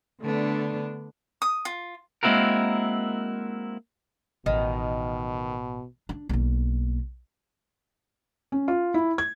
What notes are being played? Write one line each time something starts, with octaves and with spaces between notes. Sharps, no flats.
D3 A3 B3 D4
D#6
F4
G#3 A#3 C4 E4 F#4 A#4
A1 B2 D#3
D4
B1 A#3
C#4
F4
E4
G#6